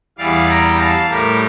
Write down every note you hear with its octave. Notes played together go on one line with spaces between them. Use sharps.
E2 E3 G3 D5 F5
G5 A#5
F5 A5
A2 G3 G4 A#4